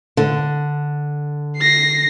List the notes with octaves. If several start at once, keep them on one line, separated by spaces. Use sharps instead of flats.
D3
A#6 C7